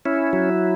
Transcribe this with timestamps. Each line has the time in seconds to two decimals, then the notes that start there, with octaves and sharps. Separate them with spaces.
0.05 C#4 E4
0.33 F#3